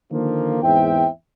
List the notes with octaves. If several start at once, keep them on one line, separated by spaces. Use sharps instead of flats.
D3 D#3 F3 A#3
E2 G#2 C4 E5 G5